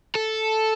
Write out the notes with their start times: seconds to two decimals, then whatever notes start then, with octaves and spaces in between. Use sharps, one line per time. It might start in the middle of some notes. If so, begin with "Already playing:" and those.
0.15 A4